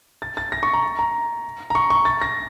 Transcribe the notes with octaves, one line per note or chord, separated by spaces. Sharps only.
A6
A6
A#6
C#6
A#5
A#5
A#5
C#6
C#6
A6
A#6